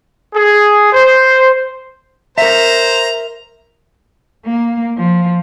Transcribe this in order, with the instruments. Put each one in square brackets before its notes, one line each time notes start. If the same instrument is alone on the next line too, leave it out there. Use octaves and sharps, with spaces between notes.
[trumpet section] G#4
C5
[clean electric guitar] A#4 E5 [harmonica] C5 A#5
[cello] A#3
F3